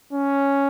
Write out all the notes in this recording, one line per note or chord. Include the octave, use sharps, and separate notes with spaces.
C#4